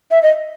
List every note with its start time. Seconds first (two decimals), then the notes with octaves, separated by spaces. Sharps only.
0.11 E5
0.23 D#5